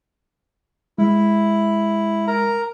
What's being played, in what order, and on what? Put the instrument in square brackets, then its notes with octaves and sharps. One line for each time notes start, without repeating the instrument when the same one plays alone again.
[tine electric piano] G#3 [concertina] E4
[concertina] A#4 A#5